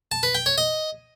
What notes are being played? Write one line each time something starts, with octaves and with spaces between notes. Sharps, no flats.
A5
B4
G5
C#5
D#5